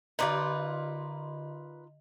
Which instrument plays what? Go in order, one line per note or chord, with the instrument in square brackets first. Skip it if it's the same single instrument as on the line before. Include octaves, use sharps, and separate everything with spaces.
[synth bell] D3 D#5 [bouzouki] D#4 F4 A#4 [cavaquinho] B4 D5 B5